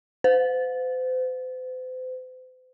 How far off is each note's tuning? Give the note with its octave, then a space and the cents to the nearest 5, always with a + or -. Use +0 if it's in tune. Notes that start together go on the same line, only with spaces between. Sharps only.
C5 -40